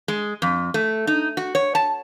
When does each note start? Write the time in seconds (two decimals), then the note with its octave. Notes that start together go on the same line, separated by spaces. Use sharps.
0.08 G#3
0.42 F2
0.74 A3
1.07 D#4
1.37 F#4
1.55 C#5
1.75 A5